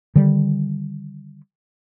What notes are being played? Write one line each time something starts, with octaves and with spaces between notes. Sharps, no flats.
D3 D#3 G3